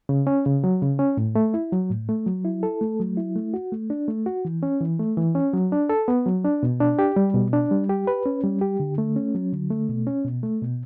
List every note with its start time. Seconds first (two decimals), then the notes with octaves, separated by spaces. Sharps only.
0.09 C#3
0.27 C#4
0.46 C#3
0.64 F#3
0.82 C#3
0.99 C#4
1.17 A2
1.35 A3
1.54 E4
1.73 F#3
1.90 A2
2.09 A3
2.27 F#3
2.45 E4
2.63 A4
2.81 A3
3.00 F#3
3.17 E4
3.36 A3
3.54 F#4
3.72 A3
3.90 D4
4.08 A3
4.26 F#4
4.45 E3
4.63 C#4
4.81 E3
4.99 A3
5.17 E3
5.35 C#4
5.53 F#3
5.72 D4
5.89 A4
6.08 B3
6.26 F#3
6.44 D4
6.63 B2
6.80 D4
6.99 G4
7.16 G3
7.34 B2
7.53 D4
7.71 G3
7.89 G4
8.07 B4
8.26 C#4
8.43 G3
8.61 G4
8.80 D3
8.98 A3
9.16 C#4
9.35 F#3
9.52 D3
9.70 A3
9.89 B2
10.07 C#4
10.25 B2
10.43 A3
10.62 B2